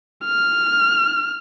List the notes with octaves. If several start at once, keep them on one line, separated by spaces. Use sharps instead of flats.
F6